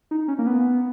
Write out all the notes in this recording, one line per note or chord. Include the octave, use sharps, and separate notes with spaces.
D#4
C#4
A#3
B3